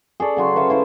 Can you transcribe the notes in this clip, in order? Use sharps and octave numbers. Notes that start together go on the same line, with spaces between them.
G#4 A4 D5
C#3 F#3 C6
B4 C#5 E5 F5
E4 C5 G#5